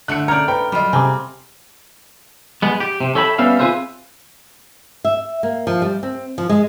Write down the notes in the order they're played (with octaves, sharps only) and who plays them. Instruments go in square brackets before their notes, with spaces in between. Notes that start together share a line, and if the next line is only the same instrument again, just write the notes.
[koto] D3 A3 [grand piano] F#6 C#7
[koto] C#5 D5 [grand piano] A#5 [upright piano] F6 G6 D7
[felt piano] B4 A#5 B5 [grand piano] G5
[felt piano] F#3 D#5 [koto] G3 F4
[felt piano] C3 [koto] C4 [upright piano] G#5 A#5 D6
[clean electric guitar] G#3 B3
G4
C3
A4 C#5 E5 G5 A#5 B5
G3 B3 C#4 E5 F5
C4 F4 G#4 B4 C5 E5
[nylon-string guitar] E5
A#3
F3
G3
C4
F3
G#3